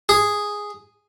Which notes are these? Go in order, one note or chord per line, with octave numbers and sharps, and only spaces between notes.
G#4